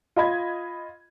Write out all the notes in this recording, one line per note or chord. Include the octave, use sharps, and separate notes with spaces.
F4 D#5 B5 G#6